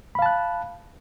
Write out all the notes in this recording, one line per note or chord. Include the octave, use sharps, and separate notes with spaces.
F5 A5 B5 F#6